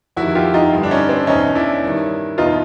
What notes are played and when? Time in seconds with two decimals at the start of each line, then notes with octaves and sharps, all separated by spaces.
0.17 F2 C3 D#3 E4 F#4
0.35 F4 G4
0.54 D#4 F4
0.72 G2 D3
0.83 D4
0.91 C#4 D#4
1.09 C4 D4
1.27 E2 B2 C#4 D#4
1.55 D4 E4
1.83 G2 D#3
2.38 E2 B2 D#4 F4